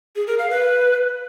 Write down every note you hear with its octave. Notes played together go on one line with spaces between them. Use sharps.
G#4
A#4
F5
B4